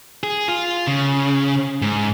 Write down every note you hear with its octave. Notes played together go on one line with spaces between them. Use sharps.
G#4
F4
C#3
G#2